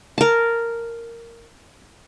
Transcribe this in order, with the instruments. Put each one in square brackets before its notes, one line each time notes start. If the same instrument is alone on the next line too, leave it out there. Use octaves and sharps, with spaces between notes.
[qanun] A#4 A5